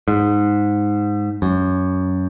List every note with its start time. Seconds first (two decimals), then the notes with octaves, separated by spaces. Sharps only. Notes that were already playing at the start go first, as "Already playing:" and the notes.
0.08 G#2
1.42 F#2